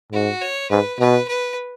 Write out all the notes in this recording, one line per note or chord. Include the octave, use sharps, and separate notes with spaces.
G#2 F#4
C#5
G#2 B4
B2 B4
B4